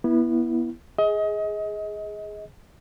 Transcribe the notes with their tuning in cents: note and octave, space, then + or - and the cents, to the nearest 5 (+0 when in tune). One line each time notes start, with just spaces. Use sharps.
B3 -25 E4 +0
G#4 +0 D#5 +30